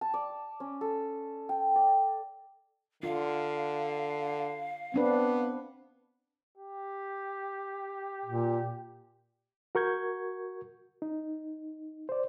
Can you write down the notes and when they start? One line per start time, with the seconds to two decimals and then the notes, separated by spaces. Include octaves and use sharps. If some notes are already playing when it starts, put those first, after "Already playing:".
0.01 A5
0.14 D5
0.60 C#4
0.81 A4
1.49 G5
1.76 D5
3.03 D3 F4 F5
4.94 B3 C4 D4 B4
6.58 G4
8.25 A#2
9.75 F#4 A#4 C#6 G6 G#6
11.02 D#4
12.09 C5 D5